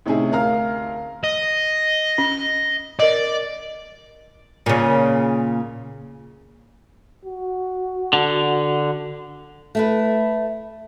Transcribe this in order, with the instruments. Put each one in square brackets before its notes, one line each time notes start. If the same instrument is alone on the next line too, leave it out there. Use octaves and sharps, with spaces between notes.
[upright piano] A2 C3 C#4 D#4 E4 G#4
D2 A#4 F5 A#5 F6
[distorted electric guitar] D#5
[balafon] C#4
[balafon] A#4 D#5 [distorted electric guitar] D5
[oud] A#2 C#3
[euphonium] F#4
[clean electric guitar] D3
[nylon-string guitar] A3 E4 B4